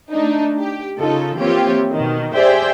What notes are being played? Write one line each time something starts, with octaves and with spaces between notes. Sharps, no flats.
A3 D4 D#4
G4
C#3 D#4 F4 A4
E3 A#3 C4 F4 G4 C#5
B2 D#3
G4 G#4 C5 D5 E5 G5